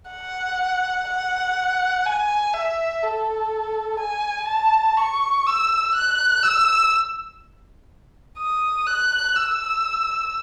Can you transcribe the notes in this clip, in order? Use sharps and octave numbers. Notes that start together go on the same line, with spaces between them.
F#5
F#5
G#5
E5
A4
G#5
A5
C#6
E6
F#6
E6
D#6
F#6
E6